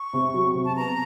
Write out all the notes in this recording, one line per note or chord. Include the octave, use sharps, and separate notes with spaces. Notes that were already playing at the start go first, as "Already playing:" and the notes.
Already playing: C#6
C3
F#3
C3
A5
B3 A#5